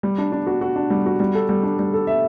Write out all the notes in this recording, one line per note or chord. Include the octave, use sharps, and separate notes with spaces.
G3
D4
D4
F#4
F#4
D4
G3
F#4
G3
A4
G3
D4
G3
A4
E5